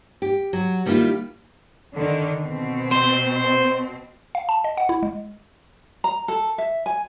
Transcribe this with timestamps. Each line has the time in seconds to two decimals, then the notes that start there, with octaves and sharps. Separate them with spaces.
0.22 G4
0.53 F#3
0.86 D#3 G3 A#3 B3 E4 F4
1.95 D3 D#3
2.40 B2 C4
2.91 C5
4.35 F5
4.49 A5
4.64 D#5
4.77 F#5
4.89 E4
5.03 G#3
6.04 A#5
6.28 A4
6.58 E5
6.86 G#5